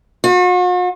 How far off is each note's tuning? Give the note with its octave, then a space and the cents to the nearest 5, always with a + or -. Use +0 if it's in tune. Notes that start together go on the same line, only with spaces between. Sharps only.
F#4 -45